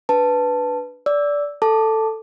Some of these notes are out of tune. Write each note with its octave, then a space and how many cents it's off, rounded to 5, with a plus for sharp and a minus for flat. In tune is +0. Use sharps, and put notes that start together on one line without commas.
D4 +0 B4 +0 A5 +0
D5 -15 E6 +0
A4 +10 A5 +0 D6 +0